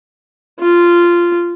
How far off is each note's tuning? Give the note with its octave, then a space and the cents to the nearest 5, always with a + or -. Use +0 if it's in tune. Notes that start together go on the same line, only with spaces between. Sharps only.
F4 -10